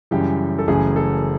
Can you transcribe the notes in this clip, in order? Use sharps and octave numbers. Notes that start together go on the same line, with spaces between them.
F#2 C#3 E3 G3 G4
A4
F#1 F#2 C#3 E3 A3 G#4
A4